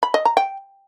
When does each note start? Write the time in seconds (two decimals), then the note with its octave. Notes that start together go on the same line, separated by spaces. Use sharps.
0.03 B5
0.14 D#5
0.25 A#5
0.37 G5